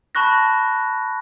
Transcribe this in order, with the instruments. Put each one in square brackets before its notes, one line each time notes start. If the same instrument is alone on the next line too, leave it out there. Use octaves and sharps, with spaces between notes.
[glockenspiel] A5 B5 C#6 F#6 A#6